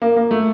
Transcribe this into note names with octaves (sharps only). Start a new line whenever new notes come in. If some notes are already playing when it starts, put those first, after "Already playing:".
A#3
A#3
A3